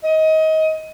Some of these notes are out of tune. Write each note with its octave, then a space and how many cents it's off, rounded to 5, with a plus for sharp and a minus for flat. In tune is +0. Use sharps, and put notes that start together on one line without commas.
D#5 +25